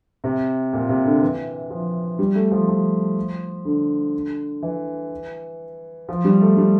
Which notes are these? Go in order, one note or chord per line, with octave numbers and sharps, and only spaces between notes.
C3
A#2
C3
D3
E3
F3
G3
A3
F3
F3
D3
E3
F3
G3
A3
G3